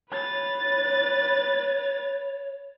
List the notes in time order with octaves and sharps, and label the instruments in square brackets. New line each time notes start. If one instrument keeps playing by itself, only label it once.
[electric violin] B4 A6 [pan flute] C#5